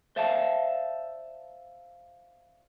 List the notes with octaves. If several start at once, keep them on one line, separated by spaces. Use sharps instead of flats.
C5 D5 E5 F5 A5